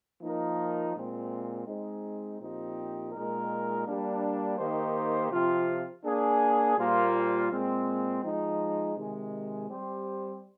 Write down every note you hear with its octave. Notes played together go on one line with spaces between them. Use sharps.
F3 A#3 D#4 A#4
A#2 G#3 C4
G#3 C4 D#4
A#2 F3 C4 D#4 G4
A#2 G#3 D#4 A#4
G3 A#3 D4
D#3 A#3 D#4 G4 C5
C3 F3 C4 F4
A#3 D4 G#4
A#2 G3 A#3 F4 C5
A#2 G#3 C4
F3 G#3 D#4
C3 D#3 G#3
G3 C4 G4 C5